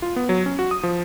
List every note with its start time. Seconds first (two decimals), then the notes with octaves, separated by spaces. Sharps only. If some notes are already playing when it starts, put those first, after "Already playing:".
0.02 F4
0.16 B3
0.29 F#3
0.46 C#4
0.59 F#4
0.71 D#6
0.83 F3